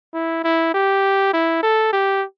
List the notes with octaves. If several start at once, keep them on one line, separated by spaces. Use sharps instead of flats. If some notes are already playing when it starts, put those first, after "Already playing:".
E4
E4
G4
E4
A4
G4